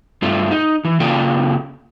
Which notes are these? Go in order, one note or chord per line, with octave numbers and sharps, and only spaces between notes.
G2 A3 F4
D#4
E3
C#3 A#3 F4 A4 D5 G5